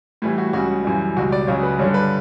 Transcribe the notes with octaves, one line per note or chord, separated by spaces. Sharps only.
A2 E3 G3
F#4
C#2 C#3 G3 F#4
F#2 E3 G3
C#2 B2 G3 F#4
D5
C#2 C#3 F#3 C#5
B4
G2 D3 G3 C#5
B4